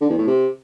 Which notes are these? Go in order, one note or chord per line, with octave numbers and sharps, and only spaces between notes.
D3
E2
A2
C3